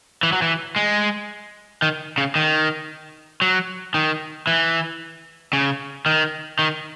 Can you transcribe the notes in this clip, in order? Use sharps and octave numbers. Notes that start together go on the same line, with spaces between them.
E3
F#3
E3
G#3
D#3
C#3
D#3
F#3
D#3
E3
C#3
D#3
D#3